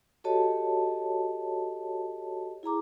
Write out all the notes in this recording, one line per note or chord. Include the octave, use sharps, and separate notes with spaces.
F#4 G4 A4 C#5 D#5 A5
E4 G#4 A#5 D6